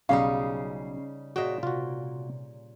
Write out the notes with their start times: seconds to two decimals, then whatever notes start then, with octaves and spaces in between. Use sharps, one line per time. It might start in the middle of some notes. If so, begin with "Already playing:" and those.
0.09 B1 C#3 G3 C#4 D#4 G#4 F5 C7
1.36 A#2 F#4 G#4 C#5 D#5 G5 E7
1.63 C3 F4 F#4